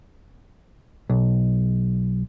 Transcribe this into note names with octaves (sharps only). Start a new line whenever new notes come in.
B1